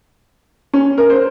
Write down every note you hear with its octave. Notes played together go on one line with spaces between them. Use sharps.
C#4
A#4
C5